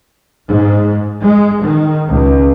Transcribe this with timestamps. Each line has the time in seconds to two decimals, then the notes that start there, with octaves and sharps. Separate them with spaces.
0.48 G#2
1.22 G#3
1.61 D#3
2.11 C#2